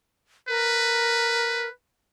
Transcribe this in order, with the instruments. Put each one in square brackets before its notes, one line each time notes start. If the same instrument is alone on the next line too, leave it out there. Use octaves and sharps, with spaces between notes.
[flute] A#4 [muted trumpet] B4